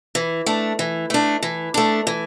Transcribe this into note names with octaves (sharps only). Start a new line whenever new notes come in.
E3
A3 D4
E3
A3 D4
E3
A3 D4
E3